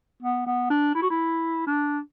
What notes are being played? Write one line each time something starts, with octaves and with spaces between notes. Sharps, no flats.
B3
B3
D4
E4
F#4
E4
D4